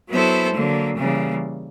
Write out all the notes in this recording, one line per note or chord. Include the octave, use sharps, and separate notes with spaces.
F#3 B3 E4 A4 C5
D3 F#3 A#3
C#3 E3 G3 A#3